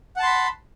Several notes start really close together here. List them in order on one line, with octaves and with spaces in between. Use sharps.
F#5 A5 C6 B5